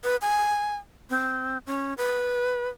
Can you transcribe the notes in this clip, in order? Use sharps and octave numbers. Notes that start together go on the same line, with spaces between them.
B4
G#5
C4
C#4
B4